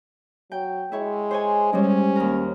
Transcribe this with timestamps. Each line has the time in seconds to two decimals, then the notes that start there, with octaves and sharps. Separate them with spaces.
0.52 F#3 G5
0.92 G#3 E4 C#5
1.31 C5 C#5 G#5
1.73 G3 G#3 C#4
2.16 D#2 A#4